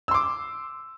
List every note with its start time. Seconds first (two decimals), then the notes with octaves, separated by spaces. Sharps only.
0.08 E6
0.11 C6
0.14 D6